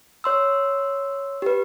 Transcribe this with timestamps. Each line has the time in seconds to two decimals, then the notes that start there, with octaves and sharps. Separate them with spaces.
0.24 C#5 C6 E6
1.42 G4 B4